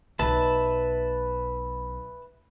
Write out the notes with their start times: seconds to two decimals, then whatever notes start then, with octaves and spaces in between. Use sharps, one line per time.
0.19 B1 B4 E5 A5